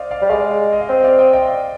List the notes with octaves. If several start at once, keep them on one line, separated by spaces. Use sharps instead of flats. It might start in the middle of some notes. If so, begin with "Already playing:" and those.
Already playing: C5 D5 D#5 F5
D5 F5
G3
G#3 D5 F5
D#5
F5
C4 D#5 G5
D5 F5
D#5 G5
D#5 G5
D5 F5